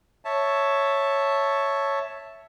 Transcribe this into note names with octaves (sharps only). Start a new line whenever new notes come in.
C#5 E5 A5